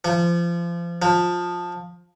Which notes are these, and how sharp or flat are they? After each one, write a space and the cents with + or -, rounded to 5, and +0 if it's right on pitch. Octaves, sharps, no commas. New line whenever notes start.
F3 -30
F3 +15